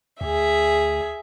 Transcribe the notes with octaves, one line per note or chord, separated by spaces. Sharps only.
D2 G#4 E5